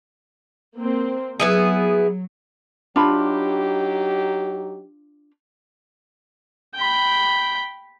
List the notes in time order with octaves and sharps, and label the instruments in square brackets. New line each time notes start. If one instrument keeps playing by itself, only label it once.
[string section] A#3 C4
[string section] F#3 [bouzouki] B3 E4 G#4
[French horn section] F#3 D#4 G4 [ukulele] D4 F4 B5
[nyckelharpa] G5 B5